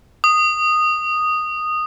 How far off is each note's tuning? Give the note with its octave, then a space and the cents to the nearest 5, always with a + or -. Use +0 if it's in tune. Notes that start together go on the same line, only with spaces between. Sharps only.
D#6 -10